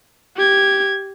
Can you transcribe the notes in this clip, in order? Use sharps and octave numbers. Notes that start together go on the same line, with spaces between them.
G4 G#6